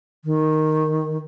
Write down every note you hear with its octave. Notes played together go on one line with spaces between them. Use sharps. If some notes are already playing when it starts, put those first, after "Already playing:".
D#3